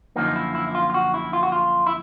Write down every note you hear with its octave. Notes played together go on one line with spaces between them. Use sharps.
F#2 D3 F3 A#3 D#4
E4
E4
E4
F4
F4
F#4
E4
F4
F#4
F4
E4